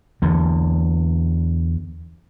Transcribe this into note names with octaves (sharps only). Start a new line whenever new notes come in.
E2 D3